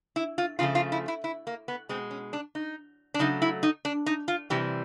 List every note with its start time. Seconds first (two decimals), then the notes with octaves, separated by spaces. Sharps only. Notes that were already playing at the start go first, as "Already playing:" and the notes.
0.16 E4
0.38 F4
0.59 C#3 F3 A3 F4
0.75 F4
0.92 E4
1.08 E4
1.24 E4
1.47 A#3
1.68 B3
1.89 B2 G#3 C4
2.11 C#4
2.33 D4
2.55 D#4
3.14 D4
3.19 C#3 F#3 A3 D#4
3.42 E4
3.63 D#4
3.85 D4
4.06 D#4
4.28 F4
4.50 C3 E3 G3 G4